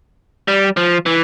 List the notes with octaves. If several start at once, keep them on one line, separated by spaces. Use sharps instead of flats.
G3
F3
E3